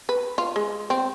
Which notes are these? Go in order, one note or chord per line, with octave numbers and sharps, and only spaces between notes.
B4
F4
G#3
C4